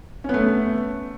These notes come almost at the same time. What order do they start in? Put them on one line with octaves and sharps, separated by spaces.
C#4 B3 A3